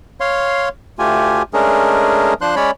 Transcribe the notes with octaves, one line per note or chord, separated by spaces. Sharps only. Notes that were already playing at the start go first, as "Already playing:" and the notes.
C#5 F5 C6
D2 A3 F4 G4 G#5
G#3 A3 C#4 D4 G#4 A#4
F3 D4 C5 C6 F#6
G#3 C#4 C#5 D5 B5